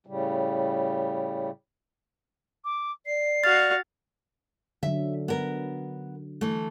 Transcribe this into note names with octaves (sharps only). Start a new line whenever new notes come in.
A2 C#3 G3
D6
D5 C7
F#4 F5 A6
D3 F#3 E5
B3 A#4
E3 A3